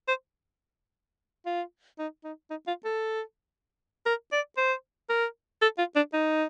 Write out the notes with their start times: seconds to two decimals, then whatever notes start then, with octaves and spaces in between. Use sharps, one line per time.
0.08 C5
1.46 F4
1.99 D#4
2.24 D#4
2.50 D#4
2.67 F4
2.85 A4
4.06 A#4
4.32 D5
4.57 C5
5.10 A#4
5.62 A4
5.78 F4
5.96 D4
6.14 D#4